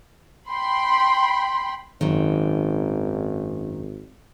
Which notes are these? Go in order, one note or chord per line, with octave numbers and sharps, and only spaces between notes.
G5 B5 C6
G#1 F#2 D#3